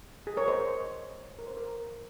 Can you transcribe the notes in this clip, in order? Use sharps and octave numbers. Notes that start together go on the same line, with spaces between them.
G#4
A#4 C#5
C5 D#5
A#4
C5
A#4